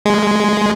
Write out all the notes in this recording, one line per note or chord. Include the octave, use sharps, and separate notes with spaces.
G#3